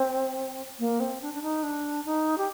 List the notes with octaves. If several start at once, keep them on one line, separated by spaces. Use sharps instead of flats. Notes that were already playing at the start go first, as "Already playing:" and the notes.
Already playing: C4
A#3
C4
D4
D4
D#4
D4
D#4
G4